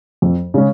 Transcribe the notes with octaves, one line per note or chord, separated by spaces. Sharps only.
F2
C#3 G#3 C#4